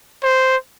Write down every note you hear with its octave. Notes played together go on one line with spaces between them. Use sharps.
C5